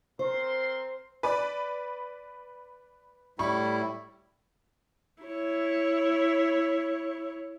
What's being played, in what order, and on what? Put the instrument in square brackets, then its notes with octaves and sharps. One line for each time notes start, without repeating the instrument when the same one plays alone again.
[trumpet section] C4 A#4 C6 [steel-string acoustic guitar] C5
[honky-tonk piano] B4 D5 B5
[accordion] A2 G3 E4 [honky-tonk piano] B5 C#6
[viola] E4 C#5